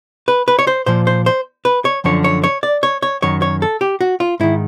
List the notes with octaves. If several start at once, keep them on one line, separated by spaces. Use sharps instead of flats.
B4
B4
C#5
C5
A#2 F3 C5
C5
C5
B4
C#5
F#2 D3 F3 C#5
C#5
C#5
D5
C#5
C#5
F#2 D#3 C#5
C#5
A4
G4
F#4
F4
G#2 D#3 E4